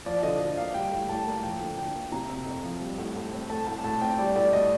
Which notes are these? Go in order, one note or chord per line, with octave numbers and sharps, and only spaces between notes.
F3 D5
D3 D#5
D3 D#5
A#3 F5
G3 G5
A2
A2 A5
A#3
F3 G5
D3
D3 G5
A#3
C3 A#5
C4
F2
F3
G3
A2
A2
C4
A3 A5
A2 A5
A2 A5
C4 G5
G3 D5
A2 D5
A2 D#5